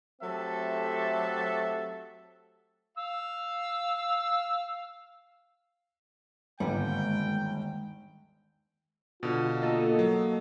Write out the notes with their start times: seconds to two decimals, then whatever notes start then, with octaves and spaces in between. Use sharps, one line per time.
0.22 F#3 A3 C4 G4 A4 E5
2.98 F5 E6
6.60 G1 D#2 G#2 D3 G#3 B3 G5
9.23 B2 D3 F4
9.62 A#3 A4 D#5
9.99 F#3